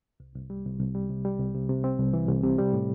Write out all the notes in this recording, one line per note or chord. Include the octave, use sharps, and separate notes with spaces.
C2
C2
G3
C2
C2
G3
C3
G3
C2
C3
C3
C4
C2
E3
C2
C3
G3
A2